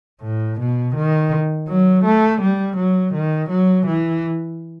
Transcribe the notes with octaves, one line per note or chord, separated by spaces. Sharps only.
A2
B2
D#3
F#3
A3
G3
F#3
D#3
F#3
E3